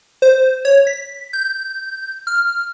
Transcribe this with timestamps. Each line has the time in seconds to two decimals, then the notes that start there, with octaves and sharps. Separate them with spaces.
0.22 C5
0.65 C#5
0.87 B6
1.33 G6
2.27 F6